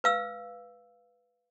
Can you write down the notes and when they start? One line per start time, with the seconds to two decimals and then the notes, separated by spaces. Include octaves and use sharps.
0.04 B4 F5 E6